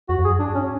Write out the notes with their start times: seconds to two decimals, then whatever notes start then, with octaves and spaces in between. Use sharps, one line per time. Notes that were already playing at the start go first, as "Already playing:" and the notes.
0.09 F2 F#4
0.19 F2
0.24 F#2 G#4
0.39 G2 D4
0.55 A2 C#4